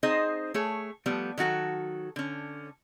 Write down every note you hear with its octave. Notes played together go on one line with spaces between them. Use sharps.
C4 D#4 G#4 C5 D#5
A3 G#4 C#5
F3 G3 A3 B3
D#3 F#3 F#4 A4
D3 C#4